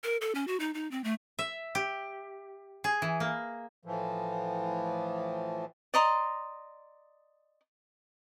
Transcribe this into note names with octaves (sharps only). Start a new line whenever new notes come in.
A#4
A4
C#4
F#4
D#4
D#4
C4
A3
E5
G4
G#4
E3
A#3
A2 E3 F3
D5 D#5 A#5 C6